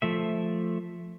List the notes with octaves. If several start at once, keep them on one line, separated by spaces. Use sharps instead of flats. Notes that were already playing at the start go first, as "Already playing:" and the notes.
F3 A3 E5